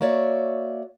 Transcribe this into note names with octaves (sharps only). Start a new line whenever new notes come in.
A#3 F#4 C#5 D5 E5